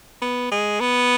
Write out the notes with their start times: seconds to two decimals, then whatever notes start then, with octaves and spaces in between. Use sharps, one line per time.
0.22 B3
0.51 G#3
0.80 B3